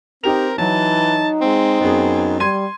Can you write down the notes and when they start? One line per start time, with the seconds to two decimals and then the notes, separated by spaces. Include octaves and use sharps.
0.24 C4 D#4 G4 A#4 F7
0.58 E3 F#3 D#4 A5
1.41 G#3 C4
1.81 F#2 B3 G#4
2.40 G3 C6 G#6 D#7